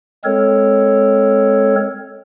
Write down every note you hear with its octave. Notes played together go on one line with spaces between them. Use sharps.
G#3 C4 A4 A#4 C#5